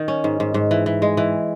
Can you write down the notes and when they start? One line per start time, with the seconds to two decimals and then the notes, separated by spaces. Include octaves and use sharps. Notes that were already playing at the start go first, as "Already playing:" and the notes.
Already playing: D#3
0.08 C#4
0.24 G#2
0.40 G#2
0.54 G#2
0.71 E3
0.86 E3
1.02 G#3
1.17 E3